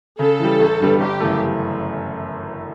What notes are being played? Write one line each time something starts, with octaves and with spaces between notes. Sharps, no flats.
C#3 A4
E3 G3
A1
G2 D3 G3 B3
G1 G4
F#2 C#3 E3 A3